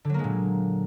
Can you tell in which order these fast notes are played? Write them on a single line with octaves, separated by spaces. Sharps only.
D3 F#3 A#3 G#3 A#2